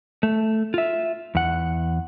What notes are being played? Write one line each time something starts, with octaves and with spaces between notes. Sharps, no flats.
A3
F4 E5
E2 F#5